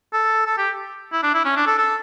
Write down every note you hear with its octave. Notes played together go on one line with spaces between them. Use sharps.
A4
A4
G4
E4
D4
E4
C#4
D4
A4
A4